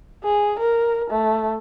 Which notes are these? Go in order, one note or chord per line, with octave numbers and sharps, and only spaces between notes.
G#4
A#4
A3